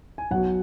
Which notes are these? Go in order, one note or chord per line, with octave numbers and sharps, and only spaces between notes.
G#5
B1 B2 F#3 F#5